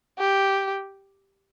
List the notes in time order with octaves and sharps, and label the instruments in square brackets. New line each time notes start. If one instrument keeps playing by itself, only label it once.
[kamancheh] G4